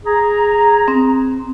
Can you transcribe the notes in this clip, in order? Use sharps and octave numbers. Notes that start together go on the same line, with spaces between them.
G#4 A#5
C4